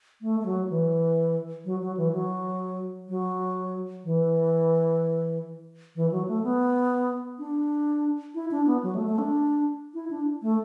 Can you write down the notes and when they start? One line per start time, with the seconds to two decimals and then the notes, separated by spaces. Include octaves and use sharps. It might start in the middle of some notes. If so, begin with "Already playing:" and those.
0.22 A3
0.40 A3
0.46 F#3
0.70 E3
1.65 F#3
1.81 F#3
1.97 E3
2.13 F#3
3.09 F#3
4.04 E3
5.96 E3
6.11 F#3
6.28 A3
6.44 B3
7.39 D4
8.35 E4
8.51 D4
8.67 B3
8.83 F#3
8.95 A3
9.07 A3
9.19 D4
9.94 E4
10.11 D4
10.42 A3